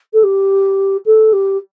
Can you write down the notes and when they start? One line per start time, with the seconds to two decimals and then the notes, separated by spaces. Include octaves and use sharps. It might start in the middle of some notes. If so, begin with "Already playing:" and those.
0.13 A4
0.23 G4
1.06 A4
1.33 G4